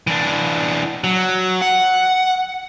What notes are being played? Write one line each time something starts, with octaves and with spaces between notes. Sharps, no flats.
E3 D4
F#3
F#5